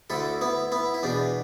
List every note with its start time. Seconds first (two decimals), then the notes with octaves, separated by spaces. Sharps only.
0.10 D2 D3 E4 A4
0.41 B3 E4
0.72 B3 E4
0.94 E4
1.03 E2 B2 D4